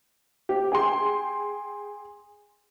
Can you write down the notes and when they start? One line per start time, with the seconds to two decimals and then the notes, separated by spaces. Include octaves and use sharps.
0.49 G4
0.72 G#4 G5 C6